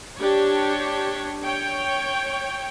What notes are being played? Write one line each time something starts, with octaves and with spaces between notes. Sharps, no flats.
D4 G4 C#5
C#5 G5